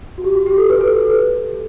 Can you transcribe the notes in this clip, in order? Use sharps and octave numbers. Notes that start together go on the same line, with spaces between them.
F#4
G4
F#4
G4
A4
B4
A4